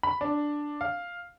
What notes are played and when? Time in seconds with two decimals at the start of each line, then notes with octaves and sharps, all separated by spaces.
0.03 B5
0.21 D4
0.81 F5